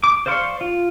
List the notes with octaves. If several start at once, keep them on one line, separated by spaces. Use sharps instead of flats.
D6
C5 D5 F5 C6 C#6
F4